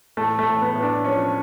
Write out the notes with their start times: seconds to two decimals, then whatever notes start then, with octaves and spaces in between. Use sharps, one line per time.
0.17 A2 A3
0.39 A3
0.47 A2
0.62 B3
0.75 A2
0.83 D4
1.05 F3 C#4